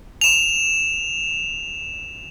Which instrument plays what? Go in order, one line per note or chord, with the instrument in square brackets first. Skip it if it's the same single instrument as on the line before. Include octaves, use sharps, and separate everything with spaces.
[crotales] E7 F7